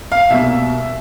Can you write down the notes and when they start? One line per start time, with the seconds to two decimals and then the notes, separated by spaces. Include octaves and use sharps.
0.12 F5
0.30 C2 B2 G3 A#3 E5